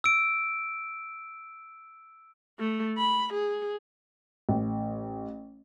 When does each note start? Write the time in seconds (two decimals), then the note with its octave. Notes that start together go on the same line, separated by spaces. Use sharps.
0.04 E6 D7
2.59 A3
2.98 B5
3.33 G#4
4.49 A1